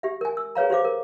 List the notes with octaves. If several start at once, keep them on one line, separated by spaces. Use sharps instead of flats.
G4 E5
A#4 G#5
E6
G#4 B4 C#5 F5 A#5
G4 C5 F5 D6
A#4